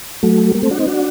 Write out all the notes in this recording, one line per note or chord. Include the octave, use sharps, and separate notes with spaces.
F#3 A3
G3 A#3
A3 C4
D4 F#4
C4 D#4
D4 F#4